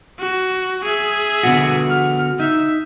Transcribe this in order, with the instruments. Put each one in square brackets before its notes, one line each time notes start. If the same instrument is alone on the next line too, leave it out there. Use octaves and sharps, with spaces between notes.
[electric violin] F#4
G#4 E5
[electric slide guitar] D3 B3 F#4
[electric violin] F6
[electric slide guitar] D#4 [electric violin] E5